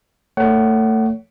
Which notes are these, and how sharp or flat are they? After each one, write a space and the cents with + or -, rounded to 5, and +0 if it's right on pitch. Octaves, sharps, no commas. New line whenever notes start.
A3 +25 C#5 +20 F#5 +30